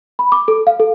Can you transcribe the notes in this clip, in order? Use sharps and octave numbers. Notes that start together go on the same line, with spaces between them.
B5
D6
A4
F5
A4